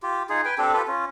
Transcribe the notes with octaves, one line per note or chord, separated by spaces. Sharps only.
F4 G4
D#4 F4 G#4
B4 G5 G#5
C4 D4 G4 A4
F4 G4 A4 B4
C#4 F4